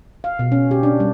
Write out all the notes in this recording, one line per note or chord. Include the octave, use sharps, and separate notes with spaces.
F5
B2
C#4
G4
D4
G3